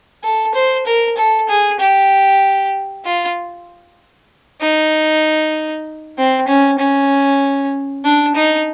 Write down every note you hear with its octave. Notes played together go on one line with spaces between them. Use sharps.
A4
C5
A#4
A4
G#4
G4
F4
D#4
C4
C#4
C#4
D4
D#4